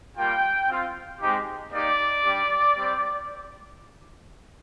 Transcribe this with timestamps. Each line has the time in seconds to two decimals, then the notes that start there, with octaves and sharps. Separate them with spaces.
0.17 G3 A#3 F4 G5
0.69 C4 F4
1.21 G#3 C4 D#4 G4
1.73 A#3 D#4 G4 D5
2.25 G3 D4 G4
2.77 G3 C4 G4